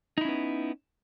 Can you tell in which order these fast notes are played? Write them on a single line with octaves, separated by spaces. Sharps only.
D#4 E4 C#4 B3